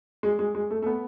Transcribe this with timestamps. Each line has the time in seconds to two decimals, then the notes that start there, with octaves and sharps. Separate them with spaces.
0.23 G#3
0.39 G#3
0.55 G#3
0.70 A3
0.82 A3
0.86 B3